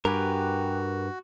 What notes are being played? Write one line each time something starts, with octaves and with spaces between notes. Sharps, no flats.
G2 F#4 G4 A#4 B4 G#5